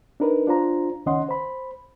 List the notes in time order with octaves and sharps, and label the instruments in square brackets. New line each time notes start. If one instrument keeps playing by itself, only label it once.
[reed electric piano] D4 D#4 A#4 B4
D4 F4 C5 A#5
C#2 D#3 C#4 D#5 F#5 C6
C5 B5